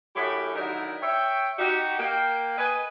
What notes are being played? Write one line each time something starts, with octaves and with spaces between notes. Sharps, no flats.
F#2 A2 G4 C#5 B5
D3 D#3 F#3 D#4 E4 A#4
C#5 E5 G5
D#4 F#4 G4
A#3 G5
B4 D#5 G#5